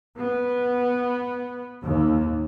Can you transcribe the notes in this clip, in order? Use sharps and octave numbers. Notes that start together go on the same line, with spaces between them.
B3
D#2